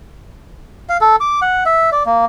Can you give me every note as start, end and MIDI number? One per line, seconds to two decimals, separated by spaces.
0.89 0.97 77
1.01 1.16 69
1.20 1.40 86
1.42 1.64 78
1.66 1.90 76
1.92 2.03 74
2.06 2.25 58